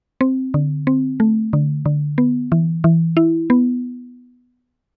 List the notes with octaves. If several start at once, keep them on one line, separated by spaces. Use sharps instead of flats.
C4
D3
C4
A3
D3
D3
B3
E3
E3
E4
B3